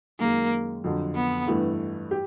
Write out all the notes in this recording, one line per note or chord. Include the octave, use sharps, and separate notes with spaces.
F#2 D#3 G#3 A#3
F2 D3 F#3
B3
G2 E3 A3
G4